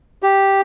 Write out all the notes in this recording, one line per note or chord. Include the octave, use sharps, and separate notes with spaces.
G4